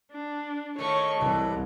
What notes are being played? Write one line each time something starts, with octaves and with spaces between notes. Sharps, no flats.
D4
A2 D#3 A3 C#5 C#6
C2 E3 F#3 G3